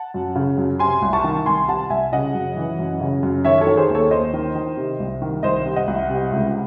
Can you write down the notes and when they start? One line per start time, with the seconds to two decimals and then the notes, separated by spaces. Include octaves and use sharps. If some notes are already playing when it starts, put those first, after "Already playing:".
Already playing: F#5 A5
0.14 F#2
0.35 C#3
0.58 F#2
0.79 C3 G#5 C6
1.02 C2
1.13 A5 C#6
1.24 D#3
1.46 C2 G#5 C6
1.68 C3 F#5 A5
1.90 C2 E5 G#5
2.13 C#3 D#5 F#5
2.34 F#2
2.57 E3
2.79 F#2
3.01 C#3
3.23 F#2
3.44 D#3 C#5 E5
3.61 A4 C#5
3.67 D#3
3.77 G#4 C5
3.89 D#2
3.95 A4 C#5
4.11 D#2 C5 D#5
4.33 D#3
4.55 D#3
4.77 C3
5.00 C2
5.22 D#3
5.43 C2 C5 D#5
5.65 C3
5.76 D#5 F#5
5.88 C2
6.09 C3
6.32 C#2